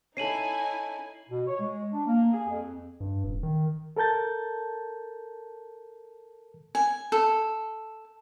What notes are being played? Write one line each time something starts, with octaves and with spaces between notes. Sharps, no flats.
C#4 D#4 E4 A4 G#5 C7 D#7 F#7
B2
C#5
G#3
D4
A#3
G#4
F2
G2
D#1
D#3
A4 A#4 A5 G6 A6
G#5
A4